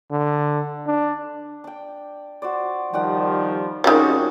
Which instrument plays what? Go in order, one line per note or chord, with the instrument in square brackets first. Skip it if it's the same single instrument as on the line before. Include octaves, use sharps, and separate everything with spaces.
[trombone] D3
D4
[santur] D4 G5
F#4 C5 D5
[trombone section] D#3 F3 G3 [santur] G4 D5 F#5
[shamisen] D#3 G3 [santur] C4 F4 [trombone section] C#4 F#4 G#4